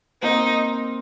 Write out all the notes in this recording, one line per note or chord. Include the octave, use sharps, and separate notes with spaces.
A#3 C4 D#4